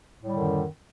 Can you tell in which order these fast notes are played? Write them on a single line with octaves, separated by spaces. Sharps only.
A2 G3 D3 F#2 D#3